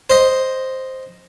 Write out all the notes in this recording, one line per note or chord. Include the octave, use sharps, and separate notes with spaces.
C5 D#5